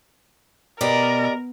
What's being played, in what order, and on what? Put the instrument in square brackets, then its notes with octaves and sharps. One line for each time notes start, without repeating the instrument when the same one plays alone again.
[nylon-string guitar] B2 [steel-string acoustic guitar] G4 D5 D#5 [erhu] A#4